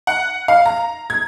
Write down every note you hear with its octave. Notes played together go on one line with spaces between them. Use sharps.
F#5
F5
A#5
G#6